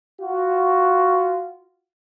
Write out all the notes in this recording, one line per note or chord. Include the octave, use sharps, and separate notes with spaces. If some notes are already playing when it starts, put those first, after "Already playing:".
F4 F#4